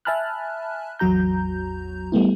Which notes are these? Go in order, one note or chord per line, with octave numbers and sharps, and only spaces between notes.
E5 G#5 A5 B5 F6 F#6
A1 E2 F#3 F#4 A#5 G6
G3 A3 B3 E4